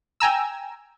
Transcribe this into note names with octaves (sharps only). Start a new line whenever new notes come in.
G5 G#5 A#5 E6